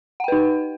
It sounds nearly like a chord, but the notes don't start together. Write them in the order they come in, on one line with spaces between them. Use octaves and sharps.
F#5 G5 B4 D#4